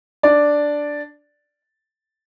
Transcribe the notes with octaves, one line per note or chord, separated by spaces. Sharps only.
D4 D5